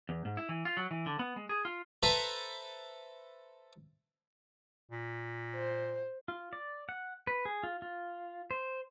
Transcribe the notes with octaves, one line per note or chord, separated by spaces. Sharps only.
E2
G#2
E4
E3
F4
F#3
E3
D3
B3
G#3
G#4
F4
A4 B4 C5 E5 A5 A#5
A#2
C5
F4
D5
F#5
B4
G#4
F4
F4
C5